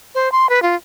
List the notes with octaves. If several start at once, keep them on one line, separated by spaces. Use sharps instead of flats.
C5
C6
B4
F4